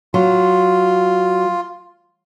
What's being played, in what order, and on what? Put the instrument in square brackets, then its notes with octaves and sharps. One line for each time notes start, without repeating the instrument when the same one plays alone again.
[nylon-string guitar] F#3 [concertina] F4